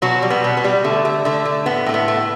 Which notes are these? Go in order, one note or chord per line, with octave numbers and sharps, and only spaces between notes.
B2 F#3 F#4
G3
B3
B2
B3
G3
D3 A3
A3
D3 A3
A3
A2 B3
A2 A3
B3
A3